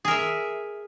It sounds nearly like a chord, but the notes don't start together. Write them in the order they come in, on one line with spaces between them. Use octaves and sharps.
G#4 A#4 E5